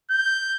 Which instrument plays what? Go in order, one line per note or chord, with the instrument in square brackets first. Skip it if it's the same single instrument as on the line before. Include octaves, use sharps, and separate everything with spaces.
[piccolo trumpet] G6